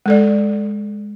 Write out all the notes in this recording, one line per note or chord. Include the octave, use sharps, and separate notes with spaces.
G#3 A4 D5